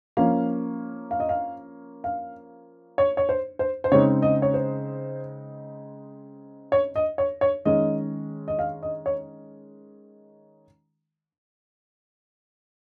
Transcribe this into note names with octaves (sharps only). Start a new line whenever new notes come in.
F3 A#3 C#4 F5
F5
D#5
F5
F5
C#5
C#5
C5
C5
C5
C#3 G#3 C4 D#4 C#5
D#5
C#5
C5
C#5
D#5
C#5
C#5
D#3 G#3 C#4 D#5
D#5
F5
D#5
C#5